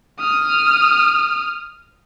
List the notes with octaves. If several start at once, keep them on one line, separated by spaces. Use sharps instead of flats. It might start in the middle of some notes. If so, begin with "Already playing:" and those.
D#6 F6